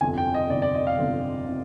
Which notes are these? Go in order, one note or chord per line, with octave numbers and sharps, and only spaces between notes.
G1 F2 C3 G#5
G5
D#5
G1 F2 C3 D5
D5
D#5
F5
G1 F2 C3
C3